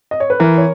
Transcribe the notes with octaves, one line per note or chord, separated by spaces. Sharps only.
D#5
C#5
B4
E3 A#4
C#5